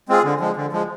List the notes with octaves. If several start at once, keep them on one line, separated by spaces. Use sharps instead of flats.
G#3 C4 F4 G#4
D3
F3 G#3
D3
F3 G#3